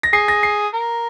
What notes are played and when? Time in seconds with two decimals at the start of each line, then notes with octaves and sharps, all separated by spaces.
0.03 A#6
0.13 G#4 C7
0.28 A#6
0.43 C7
0.73 A#4